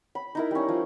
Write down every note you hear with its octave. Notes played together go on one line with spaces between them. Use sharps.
B5
D#4 E4 A#4
G3 C#4
F3